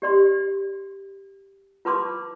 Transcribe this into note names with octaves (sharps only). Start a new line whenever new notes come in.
G4 D5 C6
F4 B4 A5 C6 D6